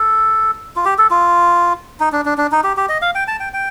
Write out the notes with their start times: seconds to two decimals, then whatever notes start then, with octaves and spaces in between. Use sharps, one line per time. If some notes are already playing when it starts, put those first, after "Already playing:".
Already playing: A4
0.76 F4
0.85 G4
0.98 A4
1.11 F4
2.00 D#4
2.12 D4
2.25 D4
2.38 D4
2.52 D#4
2.64 G4
2.77 G4
2.89 D#5
3.02 F5
3.15 G5
3.28 A5
3.40 G5
3.54 G5